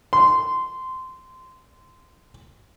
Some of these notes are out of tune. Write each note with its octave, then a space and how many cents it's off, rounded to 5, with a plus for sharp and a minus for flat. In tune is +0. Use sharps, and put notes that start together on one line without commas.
C6 -15